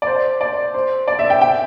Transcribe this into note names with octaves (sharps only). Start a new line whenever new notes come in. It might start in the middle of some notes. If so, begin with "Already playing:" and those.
D5
C5
D5
C5
D5
E5
G5
G5